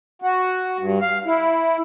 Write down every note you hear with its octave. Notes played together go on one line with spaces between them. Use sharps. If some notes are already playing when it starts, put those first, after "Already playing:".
F#4
G2
F5
E4